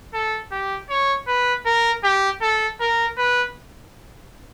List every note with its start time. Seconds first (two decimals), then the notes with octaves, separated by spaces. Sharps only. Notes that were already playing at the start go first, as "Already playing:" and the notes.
0.14 A4
0.52 G4
0.90 C#5
1.28 B4
1.66 A#4
2.04 G4
2.41 A4
2.80 A#4
3.18 B4